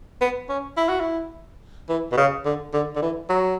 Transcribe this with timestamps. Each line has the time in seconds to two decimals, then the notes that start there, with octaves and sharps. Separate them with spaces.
0.21 B3
0.49 C#4
0.77 E4
0.89 F#4
1.00 E4
1.89 E3
2.12 B2
2.17 C#3
2.45 D3
2.73 D3
2.96 D3
3.02 E3
3.29 F#3